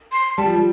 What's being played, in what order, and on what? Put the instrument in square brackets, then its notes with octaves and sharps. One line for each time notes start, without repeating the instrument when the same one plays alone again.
[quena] C6
[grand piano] G3 [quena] A5
[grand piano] F3
G3